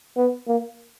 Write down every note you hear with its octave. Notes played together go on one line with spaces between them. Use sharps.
B3
A#3